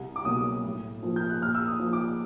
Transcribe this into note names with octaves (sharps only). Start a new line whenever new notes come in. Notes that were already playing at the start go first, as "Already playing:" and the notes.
Already playing: C2
D6
B2 F#3 A#3 D#6
A2
F3 A#3
G6
F#6
A#2 F6
E6
D#6
F3 A#3
D6